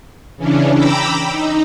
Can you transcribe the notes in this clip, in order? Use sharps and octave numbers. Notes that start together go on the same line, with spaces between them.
C#3 E3 C#4 D4
G5 A#5 B5 D6 E6
D#4